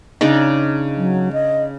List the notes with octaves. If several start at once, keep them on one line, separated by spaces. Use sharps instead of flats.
C#3 D4 D#4
F#3
D#5